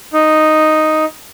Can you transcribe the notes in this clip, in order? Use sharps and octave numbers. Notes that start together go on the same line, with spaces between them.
D#4